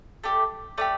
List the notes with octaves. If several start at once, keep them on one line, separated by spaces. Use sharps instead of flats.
A3 D4 G4
A3 D4 G4 D5